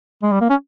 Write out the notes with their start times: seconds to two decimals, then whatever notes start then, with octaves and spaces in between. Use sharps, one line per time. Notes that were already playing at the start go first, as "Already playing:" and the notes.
0.23 G#3
0.32 G3
0.41 A#3
0.50 C#4